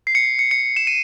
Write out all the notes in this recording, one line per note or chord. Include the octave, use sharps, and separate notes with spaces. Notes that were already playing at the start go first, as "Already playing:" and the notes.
C7
C#7
C#7
C#7
E7
D#7